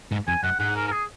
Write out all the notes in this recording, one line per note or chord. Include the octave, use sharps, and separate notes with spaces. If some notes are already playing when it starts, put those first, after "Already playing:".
G#2
F2 G#5
F#2 F#5
G#2 F#5
A#4
A#4
G#4